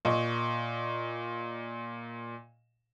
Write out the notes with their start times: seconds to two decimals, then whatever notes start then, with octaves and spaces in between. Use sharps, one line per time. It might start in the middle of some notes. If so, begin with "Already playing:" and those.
0.05 A#2 D#5 C#6